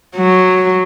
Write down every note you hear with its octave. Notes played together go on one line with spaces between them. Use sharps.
F#3